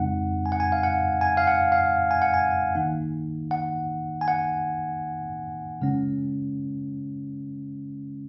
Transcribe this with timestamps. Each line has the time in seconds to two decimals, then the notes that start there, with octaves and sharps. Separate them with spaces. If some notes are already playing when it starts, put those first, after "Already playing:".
Already playing: F2 C#3 G#3 C4 D#4 F#5
0.46 G#5
0.52 F#5
0.60 G#5
0.72 F5
0.83 F#5
1.21 G#5
1.37 F5
1.47 F#5
1.72 F5
2.11 G#5
2.22 F#5
2.34 G#5
2.75 D#3 A#3 D#4
3.51 F#5
4.21 G#5
4.28 F#5
5.81 C#3 G#3 C#4